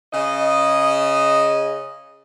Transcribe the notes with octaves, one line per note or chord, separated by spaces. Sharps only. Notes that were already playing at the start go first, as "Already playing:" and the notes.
C#3 D#5